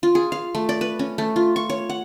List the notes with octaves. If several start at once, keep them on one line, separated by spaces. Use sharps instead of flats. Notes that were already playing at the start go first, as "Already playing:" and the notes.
F4
G#4
F5
A3
D5
B4
C#4
A3
F4
C#6
C#5
F#5